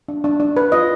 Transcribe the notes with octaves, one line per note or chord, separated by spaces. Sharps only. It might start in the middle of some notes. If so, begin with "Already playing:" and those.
D4
D4
D4
B4
F4 D#5